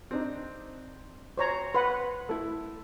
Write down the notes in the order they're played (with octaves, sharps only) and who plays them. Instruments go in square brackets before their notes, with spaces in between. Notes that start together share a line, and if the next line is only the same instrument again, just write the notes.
[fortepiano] C4 D4 D#4
[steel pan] C5 C#5 A#5
[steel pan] B4 F#5 [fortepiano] C6
[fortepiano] A3 E4